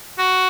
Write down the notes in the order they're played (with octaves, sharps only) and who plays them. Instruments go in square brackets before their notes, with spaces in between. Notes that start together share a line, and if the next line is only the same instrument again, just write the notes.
[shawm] F#4